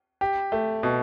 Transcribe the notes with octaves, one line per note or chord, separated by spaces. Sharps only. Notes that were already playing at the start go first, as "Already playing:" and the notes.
G4
A3
B2